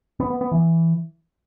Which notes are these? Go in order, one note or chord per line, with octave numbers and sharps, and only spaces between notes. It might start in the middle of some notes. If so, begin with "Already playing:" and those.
B3
B3
B3
E3